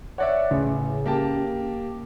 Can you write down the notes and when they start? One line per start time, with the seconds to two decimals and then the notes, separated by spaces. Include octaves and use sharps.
0.18 C#5 D5 E5 F#5
0.51 A1 C#3
1.06 A#3 G4 A5